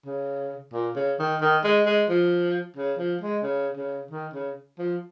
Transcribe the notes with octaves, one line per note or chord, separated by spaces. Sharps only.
C#3
A#2
C#3
D#3
D#3
G#3
G#3
F3
C#3
F3
G#3
C#3
C#3
D#3
C#3
F3